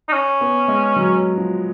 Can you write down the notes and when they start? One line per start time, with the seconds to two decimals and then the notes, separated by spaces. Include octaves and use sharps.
0.08 D#4
0.13 C#4
0.41 B3
0.68 G#3
0.96 F#3
1.38 F3